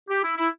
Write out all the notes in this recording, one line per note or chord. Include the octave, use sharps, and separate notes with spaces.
G4
E4
E4